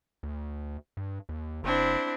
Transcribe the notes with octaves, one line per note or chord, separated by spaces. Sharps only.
D2
G2
D#2
F#1 C4 D4 E4